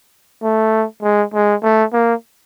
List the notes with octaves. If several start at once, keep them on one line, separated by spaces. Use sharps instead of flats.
A3
G#3
G#3
A3
A#3